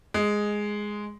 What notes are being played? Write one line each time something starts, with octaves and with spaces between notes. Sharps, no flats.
G#3